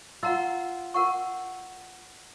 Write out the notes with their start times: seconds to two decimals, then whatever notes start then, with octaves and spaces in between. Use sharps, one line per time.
0.23 F4 F#5 A#5 E6
0.94 A#4 F#5 C#6